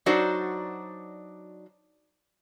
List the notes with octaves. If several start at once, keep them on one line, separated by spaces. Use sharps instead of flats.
F#3 D4 D#4 F#4 C5 D5